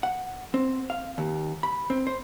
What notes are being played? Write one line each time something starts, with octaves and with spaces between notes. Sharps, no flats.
F#5
C4
F5
D#2
B5
C4
C5